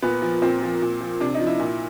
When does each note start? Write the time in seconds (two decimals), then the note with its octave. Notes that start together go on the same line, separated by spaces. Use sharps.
0.02 A#2 B3
0.22 F3
0.42 A#2 C4
0.63 F3
0.82 A#2
1.01 F3
1.20 C3 D4
1.34 D#4
1.40 F3
1.47 E4
1.59 A#2